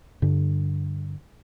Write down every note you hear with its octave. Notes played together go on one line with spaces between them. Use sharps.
G2 D3